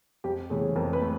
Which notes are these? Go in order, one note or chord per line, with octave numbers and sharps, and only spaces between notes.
F2 G4
C#3 E3 A3 G#4
F2 A#4
B4
A3